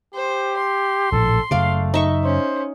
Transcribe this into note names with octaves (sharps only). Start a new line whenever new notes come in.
G4 C5
C6
A#1 A2 A4
F#2 C#3 A3 D5 F5
D#4 E5 C#6
C#4 C5